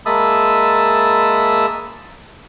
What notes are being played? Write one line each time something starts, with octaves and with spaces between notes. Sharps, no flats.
G#3 A#3 E5 A5 B5 D#6